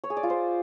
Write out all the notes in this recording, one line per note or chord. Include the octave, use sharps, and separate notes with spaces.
C#5
G#4
D5
F4
C5